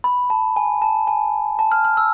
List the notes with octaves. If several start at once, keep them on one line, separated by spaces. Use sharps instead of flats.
B5
A5
G#5
A5
G#5
A5
F6
F6
E6